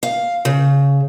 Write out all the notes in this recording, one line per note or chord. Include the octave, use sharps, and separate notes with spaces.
F5
C#3